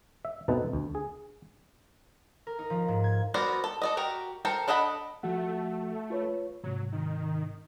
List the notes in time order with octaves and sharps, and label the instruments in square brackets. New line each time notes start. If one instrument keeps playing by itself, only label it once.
[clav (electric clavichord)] E5
B2 A3 C4 D#4 B4 A5
D2
G#4
[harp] A#4
D#4
F3
G#2
G#6
[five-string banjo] B3 F#4 A#4 C5 D5
A4
A4 D5 D#5
F#4 G4 A#4
A4 A#4 C5 G5
D4 A4 D#5 F#5 B5
[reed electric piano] F3 F#4 F#5 [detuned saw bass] A3
[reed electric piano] F4 B4 C#5
[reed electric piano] G#2 C3 [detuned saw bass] F#3
[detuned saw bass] D#3